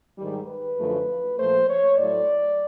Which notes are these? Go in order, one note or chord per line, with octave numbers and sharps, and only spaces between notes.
G#2 D#3 G3
B4
F#2 D3 F3 A3
A#2 F3 A3 C5
C#5
A2 F#3 A3 D5